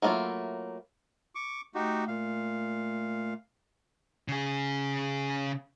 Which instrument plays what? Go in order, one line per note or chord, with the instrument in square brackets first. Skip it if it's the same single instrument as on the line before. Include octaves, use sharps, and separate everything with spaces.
[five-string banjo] F#3 A3 A#3 E4 F4
[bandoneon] C#6 D6
[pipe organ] A3 [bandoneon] D#4 F#4 G4
[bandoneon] A#2 F5
[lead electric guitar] C#3 G#4